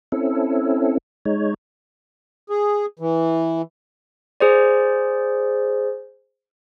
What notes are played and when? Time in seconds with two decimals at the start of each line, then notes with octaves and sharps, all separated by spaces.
0.12 C4 C#4 E4 A4
1.25 G#3 D#4 C#5
2.50 G#4
2.99 E3
4.40 G#4 C5 D5